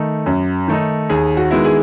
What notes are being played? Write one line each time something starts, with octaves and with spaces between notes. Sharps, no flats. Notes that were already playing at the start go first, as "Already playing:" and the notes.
Already playing: D#3 A3 D#4
F#2
D#3 A3 D#4
D#2 G#4
F#4
D#3 G#3 B3 E4
G#4